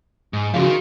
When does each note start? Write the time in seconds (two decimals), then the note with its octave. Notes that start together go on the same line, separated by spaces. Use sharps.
0.33 G#2
0.54 C#3 F3 F#4 G#4 F5
0.66 D#3